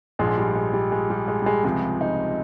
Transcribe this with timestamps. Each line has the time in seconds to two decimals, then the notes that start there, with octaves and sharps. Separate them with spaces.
0.19 A#1 G#2 F3 G#3
0.38 G3
0.55 G#3
0.74 G3
0.92 G#3
1.10 G3
1.28 G#3
1.42 G3
1.46 G#3
1.64 C#2 C3 F3 G#3
2.01 D#4